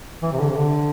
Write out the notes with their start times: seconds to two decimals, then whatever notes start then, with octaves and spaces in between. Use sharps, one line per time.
0.22 E3
0.32 C3
0.40 D3
0.49 C3
0.57 D3